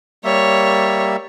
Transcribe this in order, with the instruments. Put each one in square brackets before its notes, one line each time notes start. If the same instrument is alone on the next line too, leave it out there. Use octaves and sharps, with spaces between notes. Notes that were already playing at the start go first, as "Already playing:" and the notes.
[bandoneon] G3 A#3 E5 [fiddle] C#5